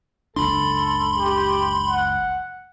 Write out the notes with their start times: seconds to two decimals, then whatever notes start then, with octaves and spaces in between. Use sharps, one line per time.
0.36 F#1 C#2 D4 A4 B5 C6
1.18 G4
1.88 F#5